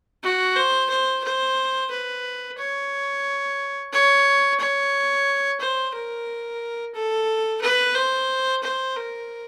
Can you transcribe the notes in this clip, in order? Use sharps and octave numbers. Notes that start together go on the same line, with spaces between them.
F#4
C5
C5
C5
B4
C#5
C#5
C#5
C5
A#4
A4
B4
C5
C5
A#4